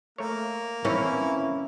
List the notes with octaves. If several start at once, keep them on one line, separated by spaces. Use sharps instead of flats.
A3 A#3 A#4 C#5
D#3 E3 C4 C#4 E4